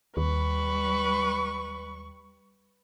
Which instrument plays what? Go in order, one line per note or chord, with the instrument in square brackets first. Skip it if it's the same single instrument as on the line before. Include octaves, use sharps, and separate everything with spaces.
[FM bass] D#2 [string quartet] G3 C#6 [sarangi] B4